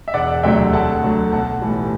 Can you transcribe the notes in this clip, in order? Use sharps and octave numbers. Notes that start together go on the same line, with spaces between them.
E5
E1 D5 F#5
D2 C3 F#3 A3 E5 G5
D2 F#5 A5
D3 F#3 A3
B1 F#5 A5
A2 E3 G3